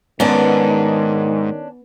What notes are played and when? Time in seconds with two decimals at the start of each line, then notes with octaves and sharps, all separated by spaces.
0.20 G#2 D#3 B3 C#4 D4